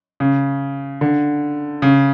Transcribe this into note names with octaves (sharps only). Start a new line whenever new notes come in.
C#3
D3
C#3